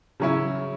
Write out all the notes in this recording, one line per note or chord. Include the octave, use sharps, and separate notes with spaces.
C#3 F#3 C#4 E4